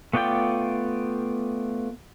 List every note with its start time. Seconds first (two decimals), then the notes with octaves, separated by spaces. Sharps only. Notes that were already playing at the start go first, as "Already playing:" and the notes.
0.13 A3 B3 F4 D5 G5